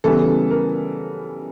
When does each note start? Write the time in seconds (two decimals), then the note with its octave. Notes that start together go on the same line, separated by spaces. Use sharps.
0.04 C#3 E3 G3 B3 A4
0.50 A#4